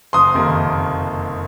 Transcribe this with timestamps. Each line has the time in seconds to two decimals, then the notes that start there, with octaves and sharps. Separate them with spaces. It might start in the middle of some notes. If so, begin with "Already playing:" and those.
0.13 F#1 C6 D#6
0.35 F2 C3 D#3 A#3